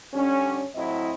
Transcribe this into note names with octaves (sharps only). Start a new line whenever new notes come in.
D3 G3 C#4
A2 F#3 C4 E4 D#5